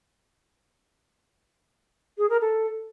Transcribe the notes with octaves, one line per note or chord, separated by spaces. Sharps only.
G#4
A#4
A4